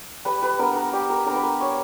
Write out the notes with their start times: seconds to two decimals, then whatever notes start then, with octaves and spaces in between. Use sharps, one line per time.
0.25 G3 B4
0.42 B4
0.59 B3 D4 A#4
0.76 A#4
0.93 G3 G4
1.10 A#4
1.26 B3 D4 A#4
1.35 B4
1.43 A#4
1.60 G3 C#5